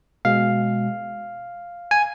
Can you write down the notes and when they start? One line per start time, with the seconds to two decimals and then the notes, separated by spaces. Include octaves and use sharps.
0.25 B2 G#3 F5
1.91 G#5